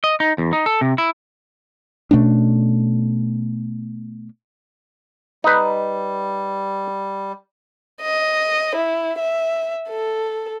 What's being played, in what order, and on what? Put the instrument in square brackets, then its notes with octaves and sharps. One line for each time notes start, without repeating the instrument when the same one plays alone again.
[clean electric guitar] D#5
D#4
E2
D#4
A4
C3
E4
[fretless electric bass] B2 A3 C#4 D4
[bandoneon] G3 [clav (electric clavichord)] D#4 B4
[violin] D#5
E4
E5
A4